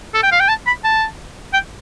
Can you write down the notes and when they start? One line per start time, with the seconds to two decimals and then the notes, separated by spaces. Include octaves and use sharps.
0.14 A4
0.23 G5
0.32 F5
0.40 G5
0.49 A5
0.67 B5
0.84 A5
1.53 G5